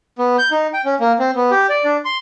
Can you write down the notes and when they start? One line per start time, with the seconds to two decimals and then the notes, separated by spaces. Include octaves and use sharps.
0.18 B3
0.38 G6
0.51 D#4
0.74 G5
0.85 C#4
1.00 A#3
1.19 C4
1.36 B3
1.51 G4
1.69 D5
1.84 D4
2.05 C6